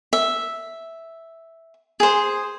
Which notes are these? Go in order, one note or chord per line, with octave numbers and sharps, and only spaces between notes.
E5
G#4 C5